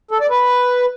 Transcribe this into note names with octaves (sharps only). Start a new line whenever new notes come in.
A4
D5
B4